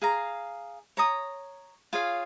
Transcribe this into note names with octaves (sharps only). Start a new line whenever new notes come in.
G#4 F5 A#5
C#5 A#5 D#6
F4 G#4 C#5 F5